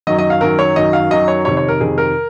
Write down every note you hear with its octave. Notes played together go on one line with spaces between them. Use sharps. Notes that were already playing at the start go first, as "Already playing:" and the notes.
F#2 D#3 F#3 D#5
D#5
F5
F#2 D#3 F#3 A#4
C#5
F#2 D#3 F#3 D#5
F5
F#2 D#3 F#3 D#5
C#5
F2 C3 D#3 C#5
C#5
A#4
F2 C3 D#3 G#4
A#4